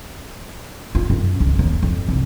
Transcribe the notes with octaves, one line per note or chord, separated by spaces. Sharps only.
F4
F#2
C#2
D#2
F2
C2